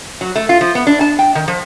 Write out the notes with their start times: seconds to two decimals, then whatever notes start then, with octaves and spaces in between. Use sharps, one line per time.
0.21 F#3
0.36 A3
0.49 F4
0.61 F3
0.75 B3
0.87 D4
1.01 A5
1.19 G5
1.35 D#3
1.48 F3